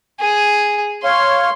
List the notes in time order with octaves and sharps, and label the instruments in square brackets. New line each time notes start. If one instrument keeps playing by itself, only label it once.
[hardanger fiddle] G#4
[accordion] C#5 F5 [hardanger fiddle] C6